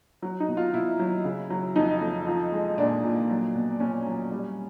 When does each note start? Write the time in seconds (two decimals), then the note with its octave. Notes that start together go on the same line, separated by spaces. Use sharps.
0.22 F#3
0.40 D#4
0.48 B2
0.57 F4
0.74 B2 E4
0.99 F#3
1.24 C#3
1.50 F#3
1.76 F2 D#4
2.01 F2
2.27 F3
2.52 G#3
2.78 A#2 D4
3.04 A#2
3.30 F#3
3.55 B2
3.80 B2 C#4
4.06 F#3
4.32 G3